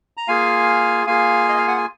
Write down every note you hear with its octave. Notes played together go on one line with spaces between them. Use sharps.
A#5
A#3 F4 G#4 F5 G#5
A#3 F4 G#4 F5 G#5
D#5
F5
F#5
G#5